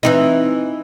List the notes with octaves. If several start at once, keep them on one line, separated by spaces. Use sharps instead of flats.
E3 C4 D#4